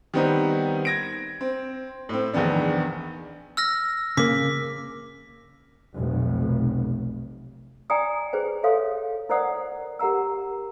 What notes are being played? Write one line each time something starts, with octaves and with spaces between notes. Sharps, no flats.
D#3 G3 B3 C4 D#4
G#6 A#6 D7
C4
A2 C4
A#1 E2 D#3 B3 D4
E6 F6 A#6
C#3 A#3 D6 B6
F1 B1
D5 G5 G#5 A#5 D#6
G#4 B4 C5 G5
A4 C#5 E5 F5 C6 D#6
E4 A#4 C5 D5 F#5 D#6
G4 A#4 F#5 A#5 E6